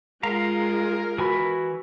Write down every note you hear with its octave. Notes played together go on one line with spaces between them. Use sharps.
G#3 F4 A#4 F5 A#5
E3 F#4 G#5 B5